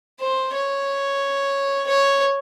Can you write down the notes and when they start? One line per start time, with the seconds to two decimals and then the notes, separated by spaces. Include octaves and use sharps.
0.20 C5
0.54 C#5
1.87 C#5